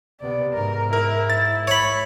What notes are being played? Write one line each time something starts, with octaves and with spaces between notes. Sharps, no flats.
C3 B3 D5
G#2 A#4
E4 A#4
A6
C#5 B5